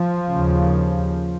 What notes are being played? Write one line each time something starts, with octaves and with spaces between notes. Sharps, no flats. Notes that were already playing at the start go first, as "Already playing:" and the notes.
Already playing: F3
D#2 C#3